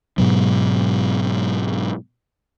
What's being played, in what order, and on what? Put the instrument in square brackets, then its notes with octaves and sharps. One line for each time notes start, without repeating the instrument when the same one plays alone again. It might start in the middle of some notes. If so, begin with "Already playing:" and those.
[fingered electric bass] G#2 B2 F#3